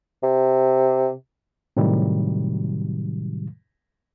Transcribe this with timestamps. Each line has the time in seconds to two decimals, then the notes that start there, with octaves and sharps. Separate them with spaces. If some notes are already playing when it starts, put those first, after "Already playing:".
0.23 C3
1.77 A2 C3 D#3 F#3 G3